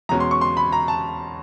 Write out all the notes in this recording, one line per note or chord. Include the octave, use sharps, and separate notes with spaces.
E2 B2 G#3 C#4 A#5
C6
C#6
C6
B5
A#5
A5